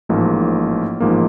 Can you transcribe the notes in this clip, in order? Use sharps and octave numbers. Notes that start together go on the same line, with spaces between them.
A1 G#2 F3 A#3
A1 G#2 F3 A#3